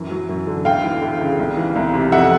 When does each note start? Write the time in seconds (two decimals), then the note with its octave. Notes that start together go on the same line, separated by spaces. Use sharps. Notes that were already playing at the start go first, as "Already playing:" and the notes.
Already playing: F#2 E3
0.10 F#3
0.29 F#2
0.47 D3
0.65 D2 F5 G5
0.84 E3
1.02 D2
1.21 C#3
1.38 C2
1.57 E3
1.76 C2
1.94 C3
2.12 F2 E5 F#5